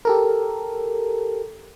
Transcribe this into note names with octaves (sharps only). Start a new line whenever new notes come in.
G4 A4 A#4